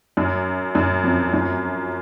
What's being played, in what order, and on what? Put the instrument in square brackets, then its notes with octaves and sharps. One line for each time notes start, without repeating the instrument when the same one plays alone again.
[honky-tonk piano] F#2
F#2
F2
F#2